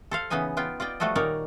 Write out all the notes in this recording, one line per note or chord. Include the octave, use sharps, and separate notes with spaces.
A4 C5 F5
C#3 E3 B3 D#4 D#5 G#5
B3 F4 G5
F4 D5 D#5 G5
F3 G3 A3 F#4 A4 D#5
A#2 D#3 D#4 A#4 C#5 D5